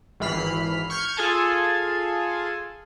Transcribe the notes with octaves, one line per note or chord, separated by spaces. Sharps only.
G#1 E3 B5 F6 C7
C#6 F6 G6 G#6 C#7
F4 G#4 A4 G#5 A5